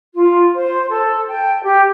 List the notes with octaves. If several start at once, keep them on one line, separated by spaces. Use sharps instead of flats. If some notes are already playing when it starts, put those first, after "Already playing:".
F4
C5
A4
G5
G4